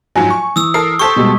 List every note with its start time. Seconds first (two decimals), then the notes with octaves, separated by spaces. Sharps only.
0.16 G#2 F3 F#3 G#5
0.30 C#6
0.56 E3 D#6 E6
0.74 A4 A#4 D#6 C7
0.99 G4 A4 C5 C#6 G#6 B6
1.16 B2 G3 G#3